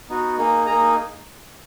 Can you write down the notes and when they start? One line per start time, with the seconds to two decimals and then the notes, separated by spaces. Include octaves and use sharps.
0.09 B3 D#4 F#4
0.37 A#3 D#4 G#4
0.66 A#3 D#4 G#4 A#5